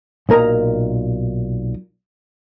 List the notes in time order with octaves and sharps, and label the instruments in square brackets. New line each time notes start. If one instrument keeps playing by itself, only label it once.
[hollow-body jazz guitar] B1 A#2 A#4 D#5 A#5